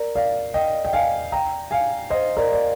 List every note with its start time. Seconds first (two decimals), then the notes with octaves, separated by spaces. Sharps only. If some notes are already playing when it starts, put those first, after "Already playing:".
Already playing: A#4 D5
0.15 D5 F5
0.54 D#5 G5
0.84 G5
0.93 F5 G#5
1.32 G5 A#5
1.71 F5 G#5
2.10 C5 D#5
2.37 A#4 D5
2.53 D5